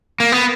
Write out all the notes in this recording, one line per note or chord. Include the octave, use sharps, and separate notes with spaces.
A#3
B3